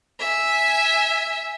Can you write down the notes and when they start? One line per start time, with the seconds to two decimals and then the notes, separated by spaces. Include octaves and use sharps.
0.20 E5 G#5